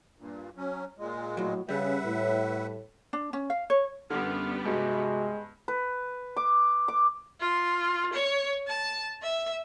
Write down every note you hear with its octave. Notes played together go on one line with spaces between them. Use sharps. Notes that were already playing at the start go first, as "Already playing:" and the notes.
G2 A#2
F#3 C#4
A#2 G#3
A2 F#3
C#3 G3 B4 E5 F#5
A2
D4
C#4
F5
C#5
F#2 D3 G3 B3 C6 F6
G2 C3 G#3 F#4
B4
D6
D6
F4
C#5
A5
E5